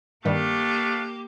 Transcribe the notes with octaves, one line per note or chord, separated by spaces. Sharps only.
G2 D#3 G3 A3 A#3 D4 G4 F5